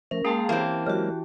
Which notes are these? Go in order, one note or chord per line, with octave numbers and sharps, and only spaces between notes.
F3 A3 C#4 A#4
G#3 A#3 G#4 F5 G5 A5 A#5 C6
E3 A#3 C4 C#4 G4
F#3 G#3 F#4 G4 A#4